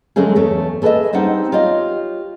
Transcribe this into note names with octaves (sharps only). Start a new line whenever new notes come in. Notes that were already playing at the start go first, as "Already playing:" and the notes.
D3 F#3 G#3 A3 C#4 G#4
E2 A3 C#5
G#4 A4 B4 C#5 D#5 E5
G3 C4 D4 D#4 F#5
F4 G4 C#5 D#5